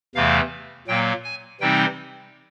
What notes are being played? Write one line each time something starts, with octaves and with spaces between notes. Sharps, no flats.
E2 C3 E3 A3 F5
A#2 F#3 A#3 G5
G#5
C3 E3 G3 C4 D#4 G5